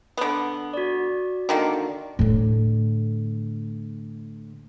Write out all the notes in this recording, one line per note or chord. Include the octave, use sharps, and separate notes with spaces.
D3 B3
F#4 D5
D3 D#3 A#3
A2 D3